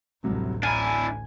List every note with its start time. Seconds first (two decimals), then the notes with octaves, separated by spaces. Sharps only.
0.24 A1 D2 C3 F#3 G3
0.63 D4 E4 G#5 A#5 F6